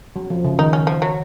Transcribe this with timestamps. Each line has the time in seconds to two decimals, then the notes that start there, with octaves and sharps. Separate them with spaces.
0.16 F#3
0.30 F3
0.44 C#3
0.59 D#3 D#4
0.73 C#4
0.87 F3
1.02 F#3